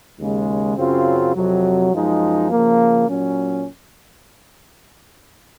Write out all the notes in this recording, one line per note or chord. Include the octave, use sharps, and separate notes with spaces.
D#2 C#3 G#3
F#2 C#3 F#3 C4 F4
F2 C3 F#3
F#2 F3 G#3 D#4
C#3 F3 A#3
A#2 F#3 C#4